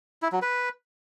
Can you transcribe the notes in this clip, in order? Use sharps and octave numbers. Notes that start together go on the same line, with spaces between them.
E4
F#3
B4